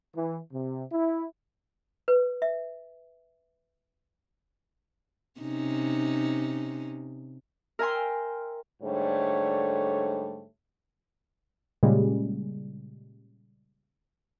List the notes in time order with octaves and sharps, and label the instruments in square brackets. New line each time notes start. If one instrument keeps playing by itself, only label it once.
[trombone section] E3
C3
E4
[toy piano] B4
E5
[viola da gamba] C3 C#4 D#4
[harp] A#4 E5 G5 G#5 A#5 C6
[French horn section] G#2 D3 G3 A3 C#5
[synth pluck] A#2 C#3 G3 G#3